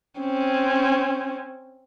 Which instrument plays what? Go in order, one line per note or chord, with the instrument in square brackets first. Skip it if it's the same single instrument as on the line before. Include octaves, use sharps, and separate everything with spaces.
[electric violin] C4 C#4